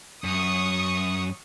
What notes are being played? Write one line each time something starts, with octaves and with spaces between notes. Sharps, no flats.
F#2 C#6 D#6